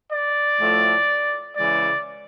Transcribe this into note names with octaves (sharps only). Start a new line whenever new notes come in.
D5
A2 F3 A3
C#3 E3 G#3 D5